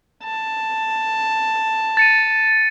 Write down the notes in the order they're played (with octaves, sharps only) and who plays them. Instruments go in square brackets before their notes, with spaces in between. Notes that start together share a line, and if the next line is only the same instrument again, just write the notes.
[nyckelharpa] A5
[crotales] A6 C#7 D#7